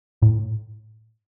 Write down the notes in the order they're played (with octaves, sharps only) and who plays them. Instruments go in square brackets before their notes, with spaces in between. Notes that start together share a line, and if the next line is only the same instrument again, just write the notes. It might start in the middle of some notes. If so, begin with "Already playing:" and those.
[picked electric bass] A2